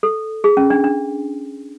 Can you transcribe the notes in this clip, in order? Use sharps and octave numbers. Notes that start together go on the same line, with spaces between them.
A4
G#4
C#4
D4
D4